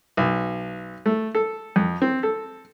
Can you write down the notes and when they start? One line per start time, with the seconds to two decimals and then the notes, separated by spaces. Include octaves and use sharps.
0.17 B1
1.06 A3
1.35 A4
1.76 F2
2.02 C4
2.23 A4